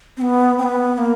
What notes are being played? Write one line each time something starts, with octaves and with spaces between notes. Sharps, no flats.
C4
B3
C4
B3
A#3